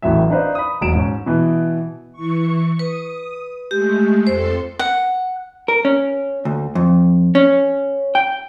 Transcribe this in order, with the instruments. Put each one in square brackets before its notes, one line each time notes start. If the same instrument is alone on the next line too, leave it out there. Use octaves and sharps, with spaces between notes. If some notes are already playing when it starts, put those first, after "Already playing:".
[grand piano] A1 A2 E3 F#3 E5
D4 D#4 B4 C5 F5
B5 D#6
E1 F#3 D7 E7
G#2 C#4
B2 E3 B3
[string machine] E3 C#6
[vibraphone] B4 [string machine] D#6
[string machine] G#3 A3 [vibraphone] G4
[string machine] F2 A4 C6 [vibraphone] C5
[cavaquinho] F#5
[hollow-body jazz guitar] A#4
C#4
D2
F2
C#4
G5